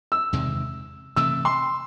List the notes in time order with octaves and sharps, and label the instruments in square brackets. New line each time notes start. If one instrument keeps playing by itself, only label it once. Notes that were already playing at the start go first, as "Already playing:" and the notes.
[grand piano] E6
[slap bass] E2 C3 D#3 G#3
[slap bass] C3 E3 A3 [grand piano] E6
[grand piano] C6